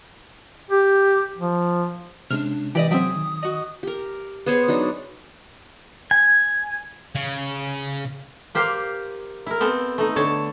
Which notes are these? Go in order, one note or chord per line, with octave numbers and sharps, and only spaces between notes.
G4
F3
C3 G#3 C#4 D4 F6
E3 G4 D5 D#5
F#3 C4 G#4 E5 G5 D#6
D#3
F#4 D#5
G4 A#4
B3 G#4 C5 C#5
F#3 D4 D#4
G#5
C#3
A#3 G4 C5 F5
E4 A#4
B3 C4 A4
A3 D#4
D3 C#5 A5